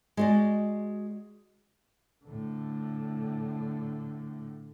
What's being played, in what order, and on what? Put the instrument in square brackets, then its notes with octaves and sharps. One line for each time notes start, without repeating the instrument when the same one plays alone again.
[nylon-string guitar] G#3 F#4 D5
[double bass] A2 D3